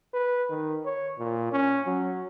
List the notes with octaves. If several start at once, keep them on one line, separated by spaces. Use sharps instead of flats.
B4
D#3
C#5
A#2
C#4
F#3